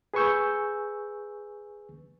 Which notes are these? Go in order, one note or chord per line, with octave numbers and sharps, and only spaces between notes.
G#4 B4 G#5 C#6 E6 G6